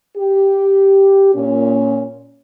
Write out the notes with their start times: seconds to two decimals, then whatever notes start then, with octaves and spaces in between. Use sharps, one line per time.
0.17 G4
1.35 A#2 C#4